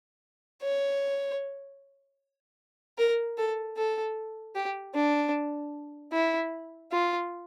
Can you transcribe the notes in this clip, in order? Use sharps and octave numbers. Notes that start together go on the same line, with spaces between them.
C#5
A#4
A4
A4
G4
D4
E4
F4